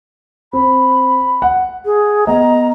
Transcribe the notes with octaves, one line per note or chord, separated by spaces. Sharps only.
C4 B5
F#5
G#4
B3 D#5 A#5